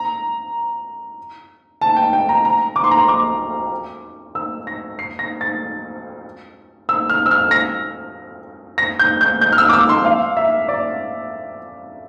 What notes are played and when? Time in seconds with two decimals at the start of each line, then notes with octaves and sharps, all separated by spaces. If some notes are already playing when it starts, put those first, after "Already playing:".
Already playing: A#5
1.81 A5
1.97 G5
2.13 G5
2.29 A#5
2.45 A#5
2.76 D6
2.84 C6
2.91 A#5
2.99 C6
3.08 D6
4.35 E6
4.67 A#6
4.99 C7
5.19 A#6
5.41 A6
6.89 E6
7.09 F6
7.26 E6
7.31 F6
7.51 A#6
8.78 A#6
8.99 G6
9.21 G6
9.41 G6
9.53 F6
9.58 E6
9.69 D6
9.73 E6
9.89 C6
10.05 F5
10.37 E5
10.68 D5